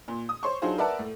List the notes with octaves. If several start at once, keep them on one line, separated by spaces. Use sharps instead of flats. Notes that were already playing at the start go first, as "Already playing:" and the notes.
A#2
D#6
C5 C#5 C6 C#6
F#3 D4 D#4 F4 G#4 C5
A#4 B4 D5 E5 F#5 A5
A2